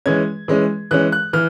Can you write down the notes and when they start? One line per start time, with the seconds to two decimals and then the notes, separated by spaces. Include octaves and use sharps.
0.06 E3 G#3 C#4 G#6
0.48 E3 G#3 C#4
0.91 E3 G#3 C#4 F#6
1.12 F#6
1.33 E3 F6